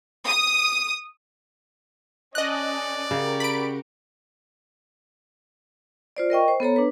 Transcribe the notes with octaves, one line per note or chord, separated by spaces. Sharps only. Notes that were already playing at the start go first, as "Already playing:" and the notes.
D#6
C#4 A4 D5 D#5 F#6
C#3 F#4 G4 A#4
B5 D7
F4 C5 D5
A#4 D#5 G5 C#6
C5
B3 A4 C#5 A#5
D4 B4